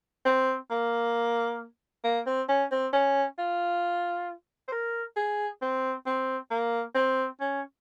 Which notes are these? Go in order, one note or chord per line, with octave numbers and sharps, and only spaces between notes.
C4
A#3
A#3
C4
C#4
C4
C#4
F4
C5
A#4
G#4
C4
C4
A#3
C4
C#4